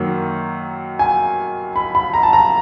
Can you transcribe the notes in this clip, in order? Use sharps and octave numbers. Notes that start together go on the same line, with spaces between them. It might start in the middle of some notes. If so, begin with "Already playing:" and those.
Already playing: F#2 D#3 F#3 A#3
G#5
B5
B5
A#5
A5
A#5